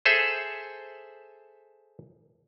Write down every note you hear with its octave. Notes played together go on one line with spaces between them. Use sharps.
G#4 A4 C5 E5